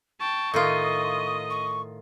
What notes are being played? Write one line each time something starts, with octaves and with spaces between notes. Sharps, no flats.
G5 A5 C#6
A2 D#3 F4 D#5 D#6
C#6